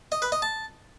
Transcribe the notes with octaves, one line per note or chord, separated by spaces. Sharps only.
D#5
B4
D#5
A5